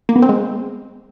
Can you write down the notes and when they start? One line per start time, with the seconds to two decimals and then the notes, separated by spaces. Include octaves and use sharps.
0.09 A#3
0.16 B3
0.22 C4
0.29 G#3